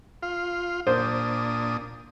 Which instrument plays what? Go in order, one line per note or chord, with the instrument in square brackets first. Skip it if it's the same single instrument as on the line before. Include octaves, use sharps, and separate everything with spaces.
[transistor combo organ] F4 F5
[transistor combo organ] A#2 D4 D#6 [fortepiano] C5